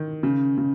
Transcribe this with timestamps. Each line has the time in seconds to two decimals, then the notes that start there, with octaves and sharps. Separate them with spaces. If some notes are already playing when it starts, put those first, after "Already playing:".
Already playing: D#3
0.23 C#3
0.58 C#3